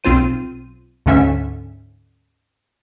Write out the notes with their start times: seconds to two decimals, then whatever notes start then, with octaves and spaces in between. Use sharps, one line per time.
0.04 B1 C4 F4 C5 D#7
1.06 D2 G#2 D3 C#4 E5